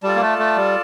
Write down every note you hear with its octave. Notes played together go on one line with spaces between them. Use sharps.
G3 F4 A4 D5 A5
A#3
A3
A3
G3